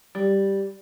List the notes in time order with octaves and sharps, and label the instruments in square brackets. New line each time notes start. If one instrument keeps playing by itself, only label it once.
[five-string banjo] G3